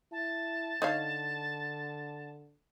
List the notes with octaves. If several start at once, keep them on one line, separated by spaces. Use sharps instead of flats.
E4 A5
D3 D#4 C#5 F5